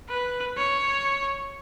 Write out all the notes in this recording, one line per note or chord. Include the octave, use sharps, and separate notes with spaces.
B4
C#5